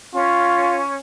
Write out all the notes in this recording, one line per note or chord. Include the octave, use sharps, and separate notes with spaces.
C#4 F4